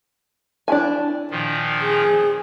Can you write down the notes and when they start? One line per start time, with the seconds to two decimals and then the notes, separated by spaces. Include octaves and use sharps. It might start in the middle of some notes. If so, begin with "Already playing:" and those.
0.68 D4 E4 G#5
1.31 A#2 D#3 F3
1.83 G#4